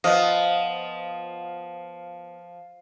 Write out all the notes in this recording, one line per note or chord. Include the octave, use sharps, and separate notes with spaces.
F3 B3 D#5 F5